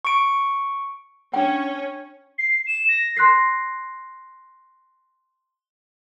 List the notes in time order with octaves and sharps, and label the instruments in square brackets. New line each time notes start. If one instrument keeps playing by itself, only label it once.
[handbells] C#6 D7
[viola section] C#4 C#5 [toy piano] D4 G5
[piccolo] C7
E7
A#6
[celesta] C6 F#6 A#6 C7